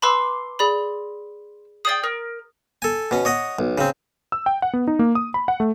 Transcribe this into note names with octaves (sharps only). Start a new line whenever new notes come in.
B4 A5 B5 C6 D6 E6
G#4 D5 B5
G#4 D5 G5 D#6 A6
A#4
A4 G#5
B2 C#4
C#5 D#5 F#5
B1
C#3 C4
E6
G5
F#5
B3
D#4
A#3
D#6
B5
F#5
A3